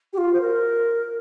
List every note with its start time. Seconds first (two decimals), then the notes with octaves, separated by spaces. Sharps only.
0.13 G4
0.18 F4
0.33 C5
0.41 A#4